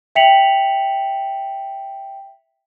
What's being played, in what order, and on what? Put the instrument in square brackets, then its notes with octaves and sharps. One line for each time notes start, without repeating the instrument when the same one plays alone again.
[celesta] E5 G5 B6 C#7 F7 F#7